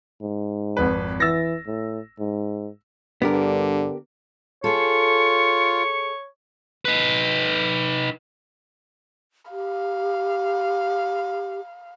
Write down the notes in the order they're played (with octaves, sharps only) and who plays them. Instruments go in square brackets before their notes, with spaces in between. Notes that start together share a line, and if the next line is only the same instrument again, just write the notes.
[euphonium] G#2
[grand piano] G#1 F2 B4
[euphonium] E3 [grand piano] E6 A6 A#6
[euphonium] A2
G#2
[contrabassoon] G2 [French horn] D3 [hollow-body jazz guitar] B3 G4 A#4
[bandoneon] F4 [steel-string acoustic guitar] G#4 A4 [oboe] C#5 [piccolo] C#7
[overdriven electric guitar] D#4 B4
[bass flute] G4 [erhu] F5